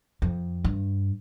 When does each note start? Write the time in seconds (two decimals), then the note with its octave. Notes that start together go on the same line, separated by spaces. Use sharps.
0.22 F2
0.64 G2